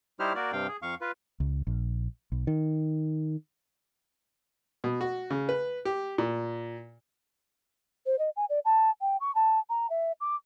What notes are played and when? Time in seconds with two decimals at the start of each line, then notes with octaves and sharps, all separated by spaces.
0.20 G3 D#4 E4 G4 C5 F6
0.35 A#3 F#4 A#4 D5
0.52 G2 C3 F5 G5
0.68 G#4
0.82 F2 F5 C#6
1.01 F4 B4
1.40 C#2
1.67 A#1
2.32 B1
2.47 D#3
4.84 B2
5.01 F#4
5.30 C#3
5.49 B4
5.85 G4
6.18 A#2
8.06 C5
8.19 D#5
8.37 G#5
8.50 D5
8.65 A5
9.01 G5
9.21 C#6
9.35 A5
9.70 A#5
9.90 E5
10.21 D6